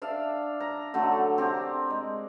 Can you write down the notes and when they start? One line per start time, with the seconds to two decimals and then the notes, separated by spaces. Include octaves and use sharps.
0.02 D4 D5 E5 F5
0.60 A#5
0.94 D3 F#3 A3 D4
1.38 C4 G4 A#4
1.90 G#3